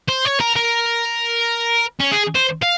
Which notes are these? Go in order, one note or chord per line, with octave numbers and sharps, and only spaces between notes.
C5
C#5
A#4
A#4
C#4
G#4
C5
F5